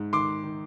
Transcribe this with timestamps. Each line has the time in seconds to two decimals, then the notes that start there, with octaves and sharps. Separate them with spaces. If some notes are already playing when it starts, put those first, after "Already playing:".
Already playing: G#2
0.13 D#3 C6 D6
0.44 D#3